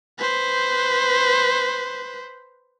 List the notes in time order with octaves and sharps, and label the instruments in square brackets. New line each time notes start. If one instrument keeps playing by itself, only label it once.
[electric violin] B4 C5